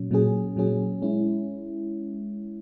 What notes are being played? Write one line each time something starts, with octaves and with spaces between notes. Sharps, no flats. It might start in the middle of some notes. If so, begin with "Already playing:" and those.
Already playing: A#2 F#3 C#4
A#2 F#3 C#4 G#4
A#2 F#3 C#4 G#4
G#3 C#4 E4